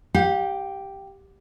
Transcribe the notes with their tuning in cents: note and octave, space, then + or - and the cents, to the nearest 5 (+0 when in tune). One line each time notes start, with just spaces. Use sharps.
G4 +0 F5 +40